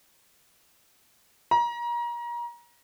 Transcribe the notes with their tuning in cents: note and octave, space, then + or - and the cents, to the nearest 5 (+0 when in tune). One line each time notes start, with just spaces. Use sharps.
A#5 +30